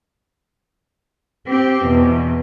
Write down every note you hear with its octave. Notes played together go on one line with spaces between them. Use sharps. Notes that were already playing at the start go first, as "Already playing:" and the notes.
C4 G4
E2 B2